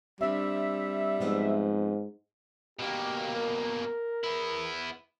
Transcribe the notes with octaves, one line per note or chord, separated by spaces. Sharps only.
G3 C4 D4 E5
G#2 F3 B3 C4
B2 A#3 G4
A#4
B3 E4